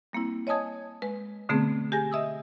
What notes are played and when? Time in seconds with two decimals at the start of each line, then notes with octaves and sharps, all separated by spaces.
0.13 G3 A#3 C4 E4
0.47 C#5 D#5 G#5 A5 D#6 G#6
1.02 G#3 B4
1.49 B2 D3 A3 B3 C4 G#4
1.92 G4 G#4 G#5 A#6
2.11 D#5 E5 D#6 E6